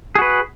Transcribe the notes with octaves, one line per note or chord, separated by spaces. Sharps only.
F#4 G#4 B4